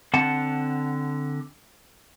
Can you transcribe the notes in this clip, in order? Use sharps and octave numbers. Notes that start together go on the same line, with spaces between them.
D3 C4 F#5 A5